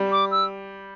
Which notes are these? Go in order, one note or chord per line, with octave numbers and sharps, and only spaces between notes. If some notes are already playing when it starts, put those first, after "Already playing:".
Already playing: G3
D6
E6